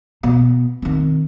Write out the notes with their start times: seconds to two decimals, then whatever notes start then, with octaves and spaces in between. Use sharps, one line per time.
0.23 B2
0.82 D#3 C4